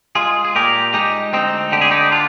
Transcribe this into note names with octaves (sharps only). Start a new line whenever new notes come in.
G#3 F4 G#4
G#4
A#2 G4 A#4
G#3 D#4 G4
D2 C4 D#4
D3 G4
G#4
D#4 G4
D4 F4